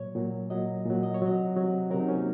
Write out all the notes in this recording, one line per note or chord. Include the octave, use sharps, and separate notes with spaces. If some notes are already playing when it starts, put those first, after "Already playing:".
Already playing: A#2 F#3 C#5
A#2 F#3
A#2 F#3 D#5
A#2 F#3
D#5
C#5
C3 F#3 D#5
C3 F#3
C3 F#3 A#4
D#4
C#4
A#3